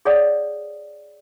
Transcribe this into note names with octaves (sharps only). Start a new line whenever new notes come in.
G#4 C#5 D5 F5 F#5 D#6